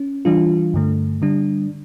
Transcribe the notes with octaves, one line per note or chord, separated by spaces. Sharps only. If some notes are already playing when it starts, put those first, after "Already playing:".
Already playing: C#4
E3 G3 D4 F4
G2 D3 A3
D3 G3 D4